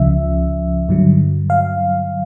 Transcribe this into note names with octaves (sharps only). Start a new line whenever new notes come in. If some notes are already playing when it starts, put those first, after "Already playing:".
Already playing: C#2 C#3 F3 E5
G2 D3 F#3
F5